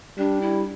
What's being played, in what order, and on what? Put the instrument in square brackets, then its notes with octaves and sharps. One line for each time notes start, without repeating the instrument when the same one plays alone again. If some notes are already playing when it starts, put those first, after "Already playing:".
[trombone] G3 [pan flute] D4
[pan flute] E4